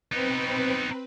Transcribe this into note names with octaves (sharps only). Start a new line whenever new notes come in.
B3 C4 D#4 B4